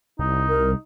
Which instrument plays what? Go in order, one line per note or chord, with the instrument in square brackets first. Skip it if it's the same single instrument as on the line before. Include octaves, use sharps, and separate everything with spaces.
[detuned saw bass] C2 [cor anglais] D#4
[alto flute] A#4